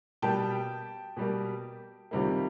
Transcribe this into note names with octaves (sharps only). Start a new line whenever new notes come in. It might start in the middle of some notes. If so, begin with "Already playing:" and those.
B2 G3 A#3 G5 A5
B2 G3 A#3
C#2 C3 D#3 G3 A#3